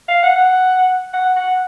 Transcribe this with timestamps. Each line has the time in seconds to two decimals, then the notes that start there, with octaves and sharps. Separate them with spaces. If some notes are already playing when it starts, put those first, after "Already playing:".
0.09 F5
0.23 F#5
1.13 F#5
1.36 F#5